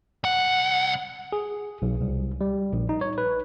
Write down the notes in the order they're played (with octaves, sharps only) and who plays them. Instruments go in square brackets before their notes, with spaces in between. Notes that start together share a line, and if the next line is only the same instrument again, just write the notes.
[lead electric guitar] C2 F#5
[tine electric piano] G#4
B1
C2
G3
A#1
D#4
C#5
B4